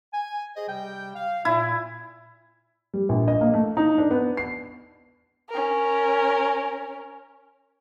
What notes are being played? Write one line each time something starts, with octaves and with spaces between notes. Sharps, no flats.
G#5
G#4 C5 D#5
C3 G3 G5
F5
A#2 E4
G3
A#1
D#5
A#3
A3
D#4
D4
B3
C7
C#4 A#4